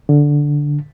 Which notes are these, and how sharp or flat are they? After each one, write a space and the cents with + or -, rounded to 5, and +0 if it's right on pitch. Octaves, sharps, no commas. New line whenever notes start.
D3 -5